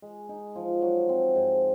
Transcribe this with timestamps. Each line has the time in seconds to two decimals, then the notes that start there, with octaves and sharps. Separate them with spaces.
0.02 G#3
0.29 D#4
0.56 F3
0.82 F#3
1.09 C4
1.35 G#2